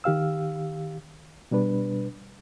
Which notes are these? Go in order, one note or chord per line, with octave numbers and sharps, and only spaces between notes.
D#3 G4 F5 E6
B2 G3 D4 B4